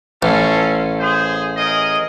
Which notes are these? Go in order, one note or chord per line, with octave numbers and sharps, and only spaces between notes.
A1 C#4 F4 A4
G#4 C5
G#4 A#4 D#5